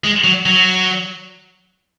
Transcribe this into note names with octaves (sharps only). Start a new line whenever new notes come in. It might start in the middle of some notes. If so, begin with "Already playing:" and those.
G#3
F#3
F#3